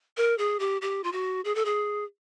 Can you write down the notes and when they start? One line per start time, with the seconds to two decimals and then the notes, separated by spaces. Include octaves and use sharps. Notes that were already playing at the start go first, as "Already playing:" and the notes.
0.17 A#4
0.38 G#4
0.60 G4
0.82 G4
1.04 F4
1.12 F#4
1.45 G#4
1.55 A4
1.65 G#4